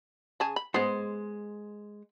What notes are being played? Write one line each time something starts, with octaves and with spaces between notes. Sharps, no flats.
C#3 G#4 A5
B5
G#3 B3 G#4 C5